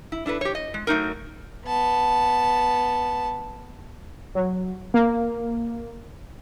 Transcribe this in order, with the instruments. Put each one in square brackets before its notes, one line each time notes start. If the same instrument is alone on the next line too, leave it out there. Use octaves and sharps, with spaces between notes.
[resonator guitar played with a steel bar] E4
D4 E4 A4 B4
G4 C#5
D#5
G#3
F#3 A3 D#4 A#4
[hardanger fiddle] B3 A5
[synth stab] F#3
A#3